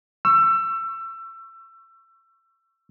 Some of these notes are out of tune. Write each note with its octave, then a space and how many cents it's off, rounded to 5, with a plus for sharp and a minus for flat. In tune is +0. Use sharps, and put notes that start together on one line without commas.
C#6 +0 E6 +25